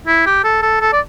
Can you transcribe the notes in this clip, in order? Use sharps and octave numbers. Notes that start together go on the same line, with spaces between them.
E4
G4
A4
A4
A4
D5